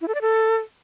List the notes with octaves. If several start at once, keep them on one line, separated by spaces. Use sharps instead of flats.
E4
A4
D5
A4